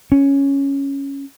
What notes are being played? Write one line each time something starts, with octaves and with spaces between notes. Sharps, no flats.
C#4